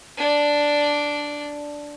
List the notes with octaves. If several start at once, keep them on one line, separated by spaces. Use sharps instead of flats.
D4 D5